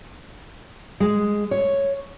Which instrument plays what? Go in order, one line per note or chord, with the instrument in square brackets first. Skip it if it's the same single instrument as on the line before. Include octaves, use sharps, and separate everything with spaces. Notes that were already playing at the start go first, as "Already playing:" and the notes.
[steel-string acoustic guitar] G#3
C#5